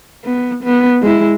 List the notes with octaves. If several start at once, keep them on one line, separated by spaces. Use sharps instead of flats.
B3
B3
G#3 E4